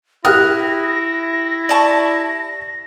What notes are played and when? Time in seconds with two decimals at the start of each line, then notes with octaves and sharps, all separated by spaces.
0.25 E4 G4 G5 D#6 F6 F#6 A#6
1.69 D5 A5 C#6